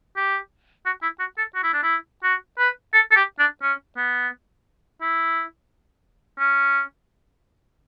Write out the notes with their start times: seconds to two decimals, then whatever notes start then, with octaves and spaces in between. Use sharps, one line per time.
0.17 G4
0.86 F#4
1.02 E4
1.20 F#4
1.38 A4
1.55 F#4
1.64 E4
1.73 D4
1.83 E4
2.24 F#4
2.59 B4
2.93 A4
3.11 A4
3.16 G4
3.39 D4
3.62 C#4
3.97 B3
5.01 E4
6.39 C#4